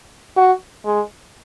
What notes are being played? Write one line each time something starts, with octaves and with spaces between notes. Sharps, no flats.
F#4
G#3